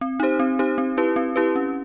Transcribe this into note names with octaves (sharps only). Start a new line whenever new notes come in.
C4
D#4 G4 C5
C4
D#4 G4 C5
C4
E4 G4 B4
C4
E4 G4 B4
C#4